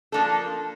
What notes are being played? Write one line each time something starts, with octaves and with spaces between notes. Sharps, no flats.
F3 A#3 D4 A4